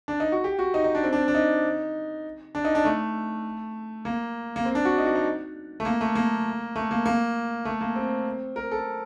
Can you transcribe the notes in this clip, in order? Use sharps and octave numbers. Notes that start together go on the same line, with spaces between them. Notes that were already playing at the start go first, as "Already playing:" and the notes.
D4
D#4
F#4
G4
F#4
D#4
D#4
D4
C4
D4
D4
D#4
D4
D#4
D4
A3
A#3
A#3
C4
D4
F#4
D#4
F#4
D#4
A3
A#3
A3
A#3
A3
A#3
A#3
A3
A#3
C4
A#4
A4